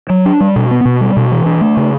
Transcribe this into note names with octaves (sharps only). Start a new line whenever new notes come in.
F#3
D4
G3
B2
B3
B2
G3
B2
E3
D4
A3
C#3